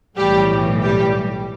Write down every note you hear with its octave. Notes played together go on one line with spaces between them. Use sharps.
B1 A2 E3 G3 G4
G3 G4